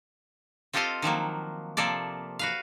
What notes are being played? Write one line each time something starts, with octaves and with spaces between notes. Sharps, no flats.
C4 F4 G4 A4 D#5 F5
D#3 F3 F#3 A#3
C3 F3 A#3 A4 D5
F#4 B4 F5